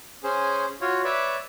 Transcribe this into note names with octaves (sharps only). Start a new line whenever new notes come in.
C#4 G#4 C5
F4 F#4 C#5
B4 C#5 D5 E5